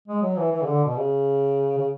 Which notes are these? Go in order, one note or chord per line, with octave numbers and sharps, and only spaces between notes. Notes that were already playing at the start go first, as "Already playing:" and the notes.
G#3
F#3
E3
E3
C#3
D3
B2
C#3
C#3